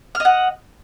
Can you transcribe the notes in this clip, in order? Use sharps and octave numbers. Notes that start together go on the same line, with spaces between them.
D#5 F#5 F6